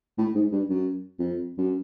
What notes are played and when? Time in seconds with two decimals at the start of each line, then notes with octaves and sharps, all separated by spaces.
0.18 A2
0.35 G#2
0.52 G2
0.69 F#2
1.19 F2
1.58 F#2